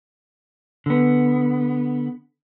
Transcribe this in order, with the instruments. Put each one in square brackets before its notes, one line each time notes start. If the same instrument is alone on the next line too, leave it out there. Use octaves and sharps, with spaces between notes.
[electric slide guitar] D3 B3